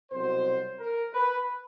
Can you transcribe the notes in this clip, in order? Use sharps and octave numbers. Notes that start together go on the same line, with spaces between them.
C2 B2 F#3 C5
A#4
B4